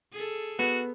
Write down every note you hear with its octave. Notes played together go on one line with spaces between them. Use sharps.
G#4 A4
B3 F#4